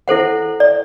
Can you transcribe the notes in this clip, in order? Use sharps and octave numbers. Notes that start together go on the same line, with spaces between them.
E4 A4 C5 F#5
D5